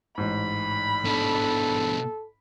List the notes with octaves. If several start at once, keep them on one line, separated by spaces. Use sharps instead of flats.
A1 G#2 B5
B2 D4 A4